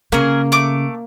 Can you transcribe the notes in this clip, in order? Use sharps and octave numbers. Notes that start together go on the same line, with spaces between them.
C#3 A#3 C#4 G#4 A#4
A3 D6